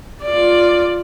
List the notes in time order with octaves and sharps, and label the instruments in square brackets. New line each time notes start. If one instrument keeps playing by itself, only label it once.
[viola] F4 D5